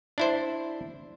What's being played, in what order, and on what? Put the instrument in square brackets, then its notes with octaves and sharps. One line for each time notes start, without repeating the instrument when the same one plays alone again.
[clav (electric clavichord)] D4 E4 C5